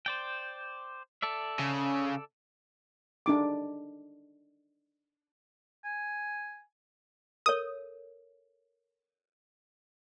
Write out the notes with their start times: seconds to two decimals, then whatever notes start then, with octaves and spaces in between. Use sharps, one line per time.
0.06 C5 D5 G5
1.22 A4 D5 E5
1.59 C#3
3.26 D4 D#4 D6
5.84 G#5
7.46 A4 A#4 C#5 D#6